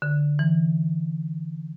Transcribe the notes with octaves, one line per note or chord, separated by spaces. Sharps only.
D3
E3